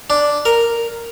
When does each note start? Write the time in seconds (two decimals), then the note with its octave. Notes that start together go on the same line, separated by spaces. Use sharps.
0.10 D4
0.45 A#4